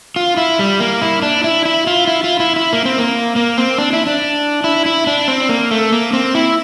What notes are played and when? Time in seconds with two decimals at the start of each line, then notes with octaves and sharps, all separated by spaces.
0.16 F4
0.37 E4
0.59 G3
0.80 A#3
1.02 E4
1.22 D4
1.44 E4
1.65 E4
1.87 F4
2.07 E4
2.24 F4
2.40 E4
2.56 E4
2.73 A#3
2.85 C4
2.98 A#3
3.36 A#3
3.57 C4
3.78 D4
3.93 E4
4.07 D4
4.64 E4
4.86 E4
5.07 D4
5.28 C4
5.49 A#3
5.71 A3
5.92 A#3
6.13 C4
6.35 E4